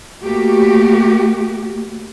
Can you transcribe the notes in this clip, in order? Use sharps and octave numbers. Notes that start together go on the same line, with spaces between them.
A3 A#3 F#4 G4